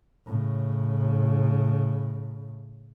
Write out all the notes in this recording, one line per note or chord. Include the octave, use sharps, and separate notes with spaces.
A2 C#3